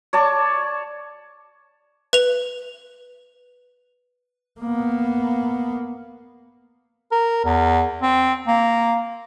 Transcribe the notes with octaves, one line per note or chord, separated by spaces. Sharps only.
C#5 D5 A5
B4 F7
A#3 B3
A#4
E2
C4
A#3